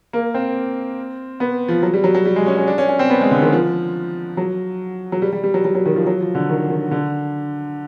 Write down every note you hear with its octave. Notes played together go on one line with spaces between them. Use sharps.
A#3
C4
B3
F3
F#3
G3
F#3
F#3
G3
G#3
C#4
C#4
D4
C#4
C#4
C4
B3
G#3
D3
D#3
F3
F#3
F#3
G3
G3
G3
F#3
F#3
F#3
D#3
F3
F#3
F3
D3
D#3
D#3
D3